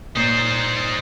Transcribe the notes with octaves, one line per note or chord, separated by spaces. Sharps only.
A#2 D#4 C5 C#5